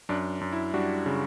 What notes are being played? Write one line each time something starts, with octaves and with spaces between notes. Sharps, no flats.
F#2 D4
F#2
E4
G3 D4 F#4
C#3